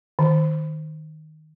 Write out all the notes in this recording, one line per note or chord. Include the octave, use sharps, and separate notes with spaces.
D#3